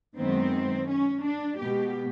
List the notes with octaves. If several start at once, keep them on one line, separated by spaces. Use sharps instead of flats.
F#2 D#3 G#3 B3 C4
C#4
D4
B2 G#3 B3 G4